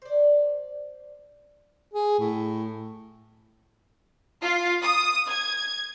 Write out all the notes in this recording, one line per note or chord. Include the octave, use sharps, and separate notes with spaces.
C5 D5
G#4
A2
F4
D#6
G#6